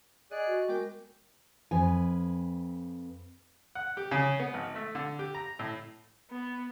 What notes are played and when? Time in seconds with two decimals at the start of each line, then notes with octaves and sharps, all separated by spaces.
0.31 G#4 D5 D#5 F#6
0.47 F#4
0.68 G#3 B3 A#4 G5 D6
1.71 F2 B4 G#5
3.75 F#5
3.97 G4
4.11 C#3
4.40 B3
4.54 G#1
4.75 A3
4.95 D3
5.19 G4
5.35 A#5
5.59 A2
6.31 B3